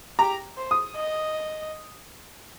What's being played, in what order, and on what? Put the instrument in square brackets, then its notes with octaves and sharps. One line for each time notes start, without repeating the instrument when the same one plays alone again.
[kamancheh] G4 [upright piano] A#5
[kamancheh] C5
[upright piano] D#6
[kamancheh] D#5